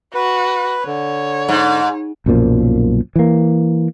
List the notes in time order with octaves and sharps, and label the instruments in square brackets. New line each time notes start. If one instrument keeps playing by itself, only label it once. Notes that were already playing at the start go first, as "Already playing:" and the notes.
[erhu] F#4 [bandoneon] B4
[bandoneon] D3 [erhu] C#5
[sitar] G#2
[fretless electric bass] B1 F#2 A#2 F3
E3 A#3